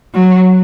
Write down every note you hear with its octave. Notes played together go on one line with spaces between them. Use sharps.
F#3